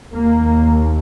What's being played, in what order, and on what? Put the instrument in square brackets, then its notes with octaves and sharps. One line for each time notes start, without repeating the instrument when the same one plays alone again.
[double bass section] D#2 A#3